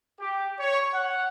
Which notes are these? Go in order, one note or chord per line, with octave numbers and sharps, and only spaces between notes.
G4
C#5
F#5